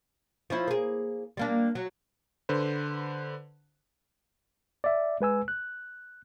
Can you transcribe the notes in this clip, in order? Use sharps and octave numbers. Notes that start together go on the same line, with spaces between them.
F3 C#4 E4
A#3 G#4
G3 A#3 D4
F#3
D3 B4 C5
D5 E5
G#3 B4 G#5 E6
F#6